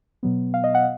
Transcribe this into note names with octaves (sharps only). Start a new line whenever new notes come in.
B2 F#3 B3
F5
D#5
F#5